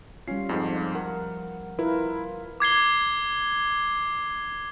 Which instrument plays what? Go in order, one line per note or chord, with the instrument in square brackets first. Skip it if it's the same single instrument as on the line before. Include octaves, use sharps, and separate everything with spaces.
[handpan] G3 F4 [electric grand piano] C#4 C7
[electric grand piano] F2 G#2 [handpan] F3
[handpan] A#4 [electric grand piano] F#5
[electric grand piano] E4 [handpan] F4 A#4 B4
[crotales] D6 G#6 C7 G7